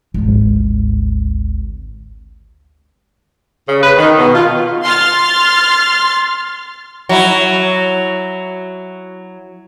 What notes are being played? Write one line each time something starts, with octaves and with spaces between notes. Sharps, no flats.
G#1 D2
C#3
B4
D#3
B2
F4
C6 F6 A6
F#3 E4